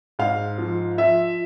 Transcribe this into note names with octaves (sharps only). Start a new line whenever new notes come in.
G#2 F5
F3
F3 E5